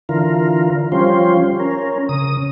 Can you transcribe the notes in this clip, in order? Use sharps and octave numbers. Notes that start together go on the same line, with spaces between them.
D3 E3 F4 A#4
F3 G3 C#4 F4 C5
C#4 A#4
C#3 D#6